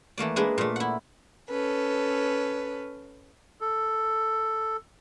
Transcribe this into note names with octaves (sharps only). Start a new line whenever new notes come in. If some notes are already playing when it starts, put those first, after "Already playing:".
E3 A3 A#3 D5
G#3 A#3 D4 G#4 B4
A#2 A3
E4 F#5
C#4 A4 B4
A4